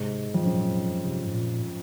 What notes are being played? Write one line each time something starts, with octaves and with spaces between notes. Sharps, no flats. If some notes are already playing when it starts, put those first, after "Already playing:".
Already playing: G#2 C3
F2
F#2 A#2
C3
G#2
A#2
A#2